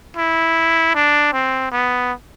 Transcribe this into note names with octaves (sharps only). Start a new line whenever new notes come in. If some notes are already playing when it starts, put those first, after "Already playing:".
E4
D4
C4
B3